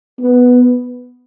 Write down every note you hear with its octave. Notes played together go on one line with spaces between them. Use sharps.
B3